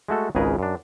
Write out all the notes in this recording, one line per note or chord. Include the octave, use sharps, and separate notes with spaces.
G#3 A3 F#4 A4
G#1 C#2 C#3 G#4 A#4 B4
F#2 D4